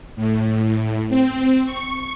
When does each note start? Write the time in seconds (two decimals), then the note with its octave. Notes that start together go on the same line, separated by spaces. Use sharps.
0.16 A2
1.09 C4
1.65 C#6